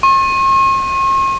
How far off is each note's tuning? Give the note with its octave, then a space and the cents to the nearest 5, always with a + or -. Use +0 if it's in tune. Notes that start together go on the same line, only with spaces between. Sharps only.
C#6 -45